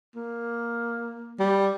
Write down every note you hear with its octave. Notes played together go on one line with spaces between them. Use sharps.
A#3
G3